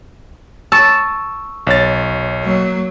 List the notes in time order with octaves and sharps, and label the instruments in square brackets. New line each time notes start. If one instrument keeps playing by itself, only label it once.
[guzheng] A5 [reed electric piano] C#6 E6
[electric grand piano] B1 C#5 A6
[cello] F#3 A#3